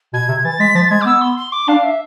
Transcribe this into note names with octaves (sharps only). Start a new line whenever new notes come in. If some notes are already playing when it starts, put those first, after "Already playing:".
B2 G#6
C3
E3 A6
G#3 B6
F3 A6
G#3 G#6
D6
B3 E6
C6
C6
D6
D4 F5
E5